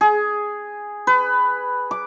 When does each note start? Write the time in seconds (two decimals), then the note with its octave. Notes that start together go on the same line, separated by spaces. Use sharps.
0.01 G#4
1.07 B4
1.91 D6